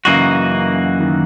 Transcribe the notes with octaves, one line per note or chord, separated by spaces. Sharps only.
F#2 C#3 E3 A#3 D#4 F#4
D#3